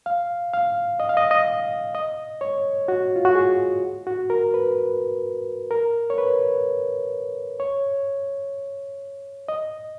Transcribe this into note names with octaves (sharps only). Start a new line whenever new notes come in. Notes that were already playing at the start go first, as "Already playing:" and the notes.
F5
F5
D#5
F5
D#5
D#5
D#5
C#5
F#4
F4
F#4
G#4
F#4
A#4
B4
A#4
C#5
B4
C#5
D#5